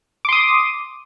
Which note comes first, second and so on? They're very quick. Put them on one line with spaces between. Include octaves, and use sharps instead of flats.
D6 C6 D#6